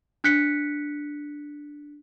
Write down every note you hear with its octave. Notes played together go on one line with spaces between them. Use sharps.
D4 F#6 B6 C#7